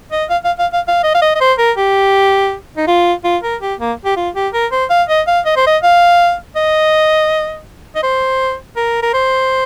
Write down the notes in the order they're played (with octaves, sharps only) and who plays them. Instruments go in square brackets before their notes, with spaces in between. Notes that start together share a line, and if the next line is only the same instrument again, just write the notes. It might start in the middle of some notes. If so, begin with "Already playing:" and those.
[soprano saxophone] D#5
F5
F5
F5
F5
F5
D#5
F5
D#5
D#5
C5
A#4
G4
D#4
F4
F4
A#4
G4
A#3
G4
F4
G4
A#4
C5
F5
D#5
F5
D#5
C5
D#5
F5
D#5
D#5
C5
A#4
A#4
C5